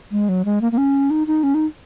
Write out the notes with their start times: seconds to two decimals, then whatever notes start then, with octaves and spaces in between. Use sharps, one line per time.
0.12 G#3
0.29 F#3
0.45 G#3
0.61 A#3
0.72 A#3
0.78 C#4
1.10 D#4
1.27 D#4
1.43 C#4
1.54 D#4